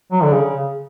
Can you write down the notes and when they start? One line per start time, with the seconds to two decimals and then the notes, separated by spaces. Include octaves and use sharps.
0.12 F#3
0.23 D3
0.33 C#3